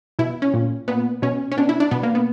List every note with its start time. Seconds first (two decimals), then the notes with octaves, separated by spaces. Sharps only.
0.19 B2 E4
0.42 C#4
0.54 A#2
0.88 A#2 B3
1.22 B2 C#4
1.52 C#4
1.57 B2 D4
1.69 E4
1.80 D4
1.91 B2 B3
2.03 A#3
2.15 B3